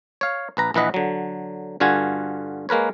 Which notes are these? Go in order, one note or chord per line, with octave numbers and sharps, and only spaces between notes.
C#5 F5
A#1 B4 A#5
A#1 E3 B4 D#5 F#5
D3 F#3
G2 D3 F4 F#4 G#5
G#3 A#3 A#4 B4 C#5